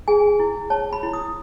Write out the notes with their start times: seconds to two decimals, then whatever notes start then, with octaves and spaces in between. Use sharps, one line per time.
0.08 G#4 G#5
0.40 E4
0.70 C#5 A5
0.93 B5
1.03 E4
1.13 D#6